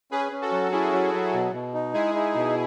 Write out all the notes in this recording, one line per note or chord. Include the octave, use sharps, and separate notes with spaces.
C#4 G#4 B4
C#4
F#4 A4
F#3
C#4 E4 G#4
F#3
F#3
B2
B2
D#4
G#3 E4 G#4
D#4
B2